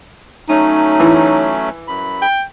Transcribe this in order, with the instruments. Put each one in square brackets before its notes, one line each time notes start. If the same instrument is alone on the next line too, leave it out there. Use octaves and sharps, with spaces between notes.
[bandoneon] F#3 A3 C#4 [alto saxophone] D#4
[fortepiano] E3
[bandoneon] F#2 B5
[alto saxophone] G5